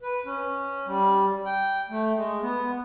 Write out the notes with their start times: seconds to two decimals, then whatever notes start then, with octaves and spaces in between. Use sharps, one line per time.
0.02 B4
0.26 C#4
0.86 G3
1.46 G5
1.90 A3
2.16 G#3
2.42 B3